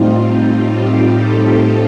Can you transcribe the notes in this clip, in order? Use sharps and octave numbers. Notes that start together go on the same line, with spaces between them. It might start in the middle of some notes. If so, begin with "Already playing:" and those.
Already playing: A2 G3 C4 D#4 F4
F4
G4
F4 A4